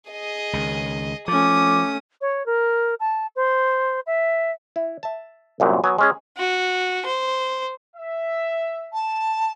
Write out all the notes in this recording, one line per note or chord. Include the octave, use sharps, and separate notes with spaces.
G#4 D#5
C#2 D#3
F3 A3 C#4 D6 D#6
C#5
A#4
A5
C5
E5
E4
E5 A5
C2 F#2 A#2
F#3 B3 G#5
G#3 C#4 G#4
F#4
C5
E5
A5